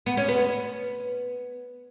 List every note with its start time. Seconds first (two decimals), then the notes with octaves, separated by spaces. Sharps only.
0.06 B3
0.17 C#4
0.28 B3